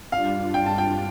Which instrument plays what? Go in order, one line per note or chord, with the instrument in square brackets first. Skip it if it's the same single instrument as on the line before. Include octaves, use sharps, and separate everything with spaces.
[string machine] G2 G3 D4 F4 [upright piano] F5
[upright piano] G5
A5
G5